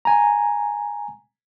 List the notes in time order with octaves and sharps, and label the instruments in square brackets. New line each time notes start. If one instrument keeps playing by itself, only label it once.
[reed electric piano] G#5 A#5